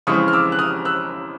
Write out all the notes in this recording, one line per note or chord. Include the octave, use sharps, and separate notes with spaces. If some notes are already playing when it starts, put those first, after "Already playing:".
F2 C#3 E3 G#3 C4 C#6 D#6
F6
D6 E6
F#6
D#6 F6
E6 F#6